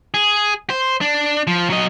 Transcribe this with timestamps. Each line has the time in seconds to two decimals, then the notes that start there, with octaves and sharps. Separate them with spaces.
0.14 G#4
0.70 C5
1.01 D4
1.47 F3
1.70 F#3 D#5